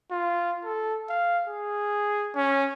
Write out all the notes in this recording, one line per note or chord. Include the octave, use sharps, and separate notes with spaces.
F4
A4
F5
G#4
C#4